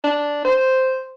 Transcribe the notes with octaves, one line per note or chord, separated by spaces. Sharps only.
D4
C5